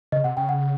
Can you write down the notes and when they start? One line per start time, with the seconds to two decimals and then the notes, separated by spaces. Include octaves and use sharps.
0.12 C#3 D#5
0.24 C3 F#5
0.37 C#3 G5
0.49 F#5